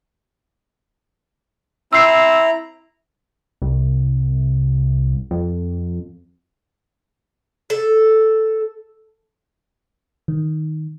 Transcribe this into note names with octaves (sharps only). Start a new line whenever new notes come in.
C4 E4 A#5 E6 C7
C2
F2
A4
D#3